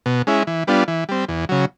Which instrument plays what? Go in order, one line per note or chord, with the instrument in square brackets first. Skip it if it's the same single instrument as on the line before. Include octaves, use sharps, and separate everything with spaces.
[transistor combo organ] B2
G#3 C#4 E4
E3
G3 B3 D4 F4
E3
G3 C4
E2
C#3 F#3